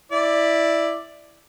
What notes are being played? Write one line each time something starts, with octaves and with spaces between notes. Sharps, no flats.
E4 D5